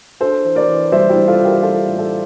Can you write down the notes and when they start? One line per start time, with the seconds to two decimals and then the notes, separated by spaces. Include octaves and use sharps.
0.20 D4 A4 C5
0.44 E3
0.55 A#4 D5
0.68 E3
0.92 G3 C5 E5
1.09 E4 G4
1.16 G3
1.28 F4 A4
1.39 E3
1.45 G4 A#4
1.63 E3 F4 A4
1.86 A2
1.99 F4 A4